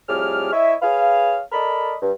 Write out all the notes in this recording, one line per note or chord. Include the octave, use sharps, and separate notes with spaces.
F2 A2 G3 G#4 D6 F6
E4 C#5 D#5 E5
G#4 B4 C#5 F5
A4 A#4 D5 D#5 B5
G2